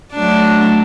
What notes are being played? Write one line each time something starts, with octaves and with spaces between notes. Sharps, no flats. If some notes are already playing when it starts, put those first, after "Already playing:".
F#3 A3 D4